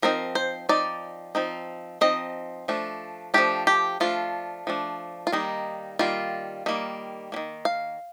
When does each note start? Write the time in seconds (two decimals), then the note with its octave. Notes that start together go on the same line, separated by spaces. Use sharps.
0.02 F3 C4 D#4 A#4
0.35 C5
0.69 F3 C4 D#4 D5
1.35 F3 C4 D#4
2.01 F3 C4 D#4 D#5
2.68 F3 A3 D4
3.34 F3 A3 D4 G4
3.67 G4
4.00 F3 A3 D4 F4
4.67 F3 A3 D4
5.27 F4
5.32 D#3 G3 A#3 D#4
5.99 D#3 G3 A#3 F4
6.66 D#3 G3 A#3
7.32 G3 A#3
7.36 D#3
7.65 F5